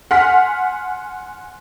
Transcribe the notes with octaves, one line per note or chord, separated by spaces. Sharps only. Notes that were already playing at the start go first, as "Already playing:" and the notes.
F#5 G#5 C6 F6 B6